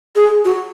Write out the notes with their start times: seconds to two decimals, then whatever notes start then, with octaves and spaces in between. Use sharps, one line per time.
0.16 G#4
0.45 F#4